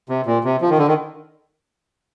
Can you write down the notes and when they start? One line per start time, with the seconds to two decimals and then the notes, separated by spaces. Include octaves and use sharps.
0.09 C3
0.26 A#2
0.44 C3
0.61 F3
0.69 D#3
0.78 D3
0.87 D#3